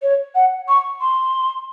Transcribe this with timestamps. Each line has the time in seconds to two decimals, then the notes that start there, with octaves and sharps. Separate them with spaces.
0.03 C#5
0.35 F#5
0.69 C#6
1.01 C6